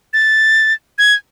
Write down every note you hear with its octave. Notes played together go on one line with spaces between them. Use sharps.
A6
G#6